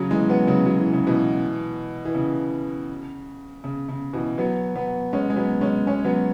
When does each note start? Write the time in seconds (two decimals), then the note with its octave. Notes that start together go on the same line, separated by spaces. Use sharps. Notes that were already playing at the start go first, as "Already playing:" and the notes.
Already playing: C#3 F#3
0.11 E3 G#3
0.29 F#3 B3
0.47 C#3 F#3
0.66 F#3
0.80 E3
0.93 C#3
1.07 B2 E3
2.05 E3
2.15 C#3
3.64 C#3
3.89 C#3
4.13 B2 E3
4.38 F#3 B3
4.75 F#3 B3
5.13 G#3 C#4
5.30 G#3
5.36 F#3 B3
5.61 G#3 C#4
5.87 G#3 C#4
6.05 F#3 B3